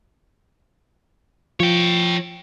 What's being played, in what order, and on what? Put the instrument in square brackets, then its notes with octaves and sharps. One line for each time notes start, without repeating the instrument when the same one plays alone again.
[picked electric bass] F3 [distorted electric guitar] C#5 G5